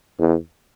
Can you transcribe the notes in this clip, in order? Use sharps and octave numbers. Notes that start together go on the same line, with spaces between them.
E2